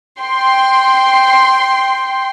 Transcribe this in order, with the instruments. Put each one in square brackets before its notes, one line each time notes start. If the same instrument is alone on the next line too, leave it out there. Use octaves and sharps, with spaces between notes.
[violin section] G5 C6